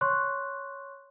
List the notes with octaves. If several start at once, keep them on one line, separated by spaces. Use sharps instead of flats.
C#5 C6 C#6 F#6